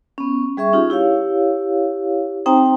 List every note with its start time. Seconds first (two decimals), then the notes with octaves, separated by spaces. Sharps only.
0.18 B3 C#4
0.57 G3 G#4 E5 C#6
0.73 C#4 D#4 F4 G4 G#4
0.90 E4 G4 C#5 F5
2.46 C4 D#4 C5 G5 A#5 D#6